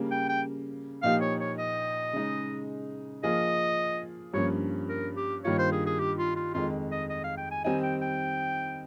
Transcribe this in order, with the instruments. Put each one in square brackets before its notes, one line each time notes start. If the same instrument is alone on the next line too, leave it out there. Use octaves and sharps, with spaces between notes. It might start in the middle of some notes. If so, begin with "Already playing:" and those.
Already playing: [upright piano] C#3 G3 A#3
[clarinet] G5
G5
[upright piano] A#2 F3 A#3 D#4 G4 [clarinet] F5
[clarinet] C#5
C#5
D#5
[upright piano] C#3 G#3 D#4
[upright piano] F3 A#3 F4 G#4 [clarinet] D#5
[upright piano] G2 F3 A#3 C#4 [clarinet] C#5
[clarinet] A#4
G4
[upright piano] G2 D#3 A#3 F4 [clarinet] C#5
[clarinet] C5
G#4
G#4
G4
F4
F4
[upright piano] F2 D#3 G#3 [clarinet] F4
[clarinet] D#5
D#5
F5
G5
G#5
[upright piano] D#3 G3 C4 D#4 [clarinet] G#5
[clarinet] G5
G5